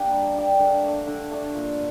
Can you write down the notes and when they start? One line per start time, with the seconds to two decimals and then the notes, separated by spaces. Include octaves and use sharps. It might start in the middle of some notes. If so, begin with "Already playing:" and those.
Already playing: A#3 D4 G4
0.12 G3
0.35 D4 G4
0.59 D3
0.83 A3 D4
1.07 D3
1.31 A3 D4
1.54 A#2